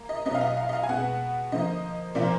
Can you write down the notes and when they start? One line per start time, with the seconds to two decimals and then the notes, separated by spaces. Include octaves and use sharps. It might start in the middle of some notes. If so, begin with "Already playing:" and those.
Already playing: A#3
0.09 D#5
0.26 B2 F#3 B3 D#5
0.35 F5
0.41 D#5
0.57 F5
0.69 D#5
0.73 F5
0.83 G#5
0.89 B2 G#3 B3 F#5
1.52 D3 F3 A#3 D#5
2.15 A#2 F3 A#3 D5